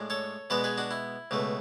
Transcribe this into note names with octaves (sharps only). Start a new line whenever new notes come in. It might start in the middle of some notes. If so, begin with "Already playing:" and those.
Already playing: A2 G#3 D4
A4 C#5
B2 G#3 B3 B4 D5
G#4 B4
D4 F#4
E4
C#2 B2 A3